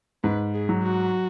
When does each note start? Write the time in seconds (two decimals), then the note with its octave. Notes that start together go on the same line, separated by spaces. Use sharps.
0.23 G#2 B4
0.54 G#4
0.69 F#3
0.83 F#4